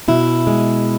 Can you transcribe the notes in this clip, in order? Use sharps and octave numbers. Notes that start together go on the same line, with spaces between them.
B2 E4
G#3